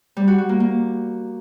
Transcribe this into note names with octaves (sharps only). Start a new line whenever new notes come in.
G3
F#4
F#4
A#3
A#3